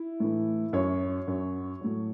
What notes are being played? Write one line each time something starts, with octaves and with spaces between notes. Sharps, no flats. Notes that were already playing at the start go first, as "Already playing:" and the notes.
Already playing: E4
A2 E3
F#2 F#3 C#5
F#2 F#3
A2 F#3